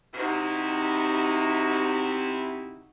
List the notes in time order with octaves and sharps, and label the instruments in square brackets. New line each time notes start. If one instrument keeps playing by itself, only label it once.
[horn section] C3 E4 [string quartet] D#4 F#4